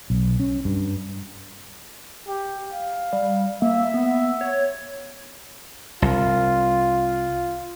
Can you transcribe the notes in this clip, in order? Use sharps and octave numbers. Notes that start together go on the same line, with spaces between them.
B1
C#4
G2
G4
F5
G3
A#3 E5
B3
C#5
C2 F4